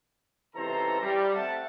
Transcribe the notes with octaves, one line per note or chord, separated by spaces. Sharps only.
C#2 C3 E3 A4 C5 A#5
G3
A3 C4 E5 F#5 A5